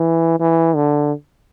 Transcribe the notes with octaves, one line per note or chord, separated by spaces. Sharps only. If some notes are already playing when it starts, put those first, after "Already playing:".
Already playing: E3
E3
D3